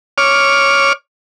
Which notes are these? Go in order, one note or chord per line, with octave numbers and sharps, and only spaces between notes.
C#5 D6 F6